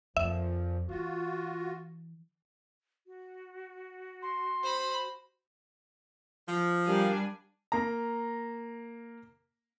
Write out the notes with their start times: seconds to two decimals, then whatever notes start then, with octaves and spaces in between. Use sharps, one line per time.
0.17 F2 A#2 F3 E5
0.89 E3 F4 F#4
3.07 F#4
4.22 C6
4.63 C5 B5
6.48 F3
6.87 G3 D4 G4 A#4 F5 G#5
7.72 A#3 A#5